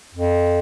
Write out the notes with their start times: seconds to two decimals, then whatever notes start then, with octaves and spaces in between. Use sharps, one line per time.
0.15 F2